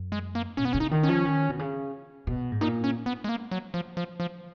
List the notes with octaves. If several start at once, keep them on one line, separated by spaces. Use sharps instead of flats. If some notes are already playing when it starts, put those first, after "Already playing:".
Already playing: F#2
G#3
A#3
B2 C#4
B3
C#3 C#4
D#4
D#3
C#4
F3
D#3
B2
C#3
B2
G#2
A#2 D#4
C#4
B3
G#3
A#3
F#3
F3
F3
F3